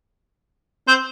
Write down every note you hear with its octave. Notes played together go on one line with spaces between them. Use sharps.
C4 C5